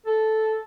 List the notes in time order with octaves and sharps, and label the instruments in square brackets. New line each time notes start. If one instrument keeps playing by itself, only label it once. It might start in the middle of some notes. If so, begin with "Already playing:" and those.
[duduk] A4